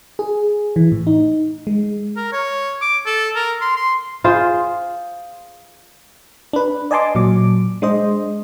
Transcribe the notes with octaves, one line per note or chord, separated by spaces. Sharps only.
G#4
E3
A2
D#4
G#3
A#4
C#5
D6
A4
A#4
C6
C6
F4 G#4 C5
D4 B4
D5 D#5 G#5 A5 C6 D6
A#2 F#3 D6
G#3 D4 C5 D#5